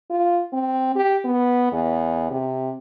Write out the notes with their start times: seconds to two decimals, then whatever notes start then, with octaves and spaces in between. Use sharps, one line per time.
0.10 F4
0.53 C4
0.95 G4
1.25 B3
1.72 E2
2.31 C3